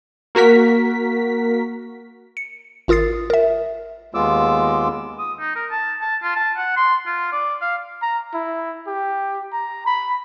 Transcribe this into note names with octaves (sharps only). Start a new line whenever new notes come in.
A#3 F#4 A#4 B6
C#7
G#1 F4 A#4 D#6 A6 C7
A#4 E5
D#2 G#3 B3 F4 D6 E6
D#6
D#4
A#4
A5
A5
F4
A5
F#5
C6
F4
D5
F5
A#5
E4
G4
A#5
B5